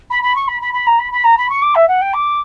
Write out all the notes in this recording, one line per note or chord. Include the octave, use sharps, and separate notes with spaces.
B5
B5
C#6
B5
B5
B5
A#5
B5
B5
A#5
B5
C#6
D6
E5
F#5
G5
D6